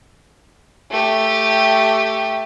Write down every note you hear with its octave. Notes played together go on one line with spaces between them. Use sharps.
A3 G4